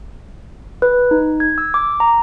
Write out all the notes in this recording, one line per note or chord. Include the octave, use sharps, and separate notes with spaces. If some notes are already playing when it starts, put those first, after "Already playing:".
B4
D#4
G#6
E6
D6
A#5